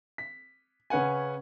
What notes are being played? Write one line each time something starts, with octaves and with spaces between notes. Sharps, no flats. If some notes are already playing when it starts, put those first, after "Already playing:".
B6
C#3 C#4 B4 F#5 G#5